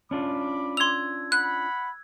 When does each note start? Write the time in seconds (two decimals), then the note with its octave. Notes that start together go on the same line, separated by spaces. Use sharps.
0.11 C#4 D4 F4 B5 D6
0.77 C6 E6 G#6 F7
1.32 F#5 B5 F#6